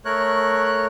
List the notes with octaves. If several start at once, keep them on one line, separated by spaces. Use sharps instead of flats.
A3 A#4 C#5 F#6